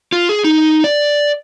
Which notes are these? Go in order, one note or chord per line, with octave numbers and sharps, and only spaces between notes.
F4
G#4
D#4
D5